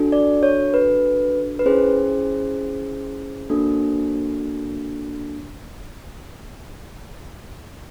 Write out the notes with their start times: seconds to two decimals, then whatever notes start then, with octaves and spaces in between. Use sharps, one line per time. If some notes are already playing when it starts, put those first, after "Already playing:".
Already playing: D4 F#4 A4
0.12 D5
0.43 C#5
0.74 B4
1.59 B4
1.66 C#4 E4 G#4 C5
3.50 A#3 D4 F#4 A4